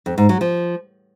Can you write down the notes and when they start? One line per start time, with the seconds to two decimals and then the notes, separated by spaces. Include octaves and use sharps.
0.06 F2
0.18 G#2
0.29 F#3
0.41 F3